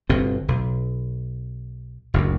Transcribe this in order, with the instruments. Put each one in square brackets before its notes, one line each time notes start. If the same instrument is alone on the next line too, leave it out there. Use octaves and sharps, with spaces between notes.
[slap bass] G1 B2 C4
B1
F#1 D2